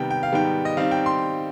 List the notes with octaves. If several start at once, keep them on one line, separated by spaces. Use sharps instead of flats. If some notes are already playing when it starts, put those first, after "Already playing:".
Already playing: C3 D#3 G3 B3 G5
G5
F5
G#2 D#3 G3 B3 G5
D#5
D#3 G3 C4 D#4 F5
G5
C6